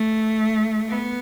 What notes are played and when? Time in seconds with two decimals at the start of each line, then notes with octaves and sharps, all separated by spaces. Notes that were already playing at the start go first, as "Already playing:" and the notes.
Already playing: A3
0.88 B3